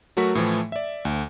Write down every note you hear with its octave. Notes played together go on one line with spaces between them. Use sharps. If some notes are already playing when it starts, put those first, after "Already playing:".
F#3 A3 F#4 A#4 C#6 B6
A2 E3 F3 A3
D5 E5
D2